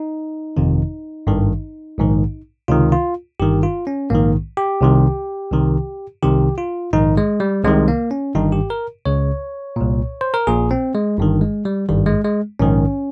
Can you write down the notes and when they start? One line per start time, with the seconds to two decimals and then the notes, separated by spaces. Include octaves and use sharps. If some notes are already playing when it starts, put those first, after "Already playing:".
Already playing: D#4
0.57 G1 F2 C3 D#3
1.27 G#1 G2 D#3
1.98 A#1 G#2 D#3
2.68 C#2 C3 D#3 F4
2.92 F4
3.40 G1 G2 D#3 G4
3.63 F4
3.87 C#4
4.10 A#1 G#2 D#3 A#3
4.57 G4
4.81 C2 C3 D#3
5.52 C2 C3 D#3
6.23 C2 C3 D#3 G4
6.58 F4
6.93 A#1 G#2 D#3 D#4
7.17 G#3
7.40 G3
7.64 C2 C3 D#3 G#3
7.88 A#3
8.11 C#4
8.35 G1 G2 D#3 D#4
8.52 G4
8.70 A#4
9.05 C#2 C#3 C#5
9.76 C2 A#2
10.21 C5
10.34 A#4
10.47 A#1 A#2 G#4
10.71 C4
10.95 G#3
11.18 G1 G2 D#3
11.41 G#3
11.65 G3
11.89 G#1 G2 D#3 G3
12.06 G#3
12.24 G#3
12.59 A#1 G#2 D#3 C#4